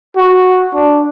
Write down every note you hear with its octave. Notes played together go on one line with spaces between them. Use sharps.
F#4
D4